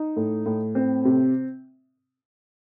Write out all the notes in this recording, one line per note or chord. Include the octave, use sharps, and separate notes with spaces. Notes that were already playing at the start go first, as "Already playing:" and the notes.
Already playing: D#4
A2
A2
C4
C3